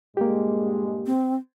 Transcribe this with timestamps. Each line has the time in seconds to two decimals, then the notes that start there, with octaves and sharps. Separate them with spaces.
0.17 G2 A#2 G#3 A#3 G4
1.06 C4